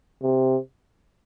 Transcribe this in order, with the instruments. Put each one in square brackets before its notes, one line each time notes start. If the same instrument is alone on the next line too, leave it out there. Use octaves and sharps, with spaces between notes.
[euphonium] C3